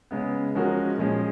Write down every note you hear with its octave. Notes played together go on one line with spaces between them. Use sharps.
C#3 G#3 B3
F3 G#3 C#4 F#4 A#4
A#2 F3 G#3 C#4 G#4